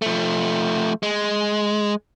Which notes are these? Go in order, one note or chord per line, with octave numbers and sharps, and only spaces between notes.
F3 A3
G#3